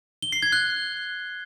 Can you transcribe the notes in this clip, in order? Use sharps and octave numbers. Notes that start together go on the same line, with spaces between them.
G7
C7
G#6
F#6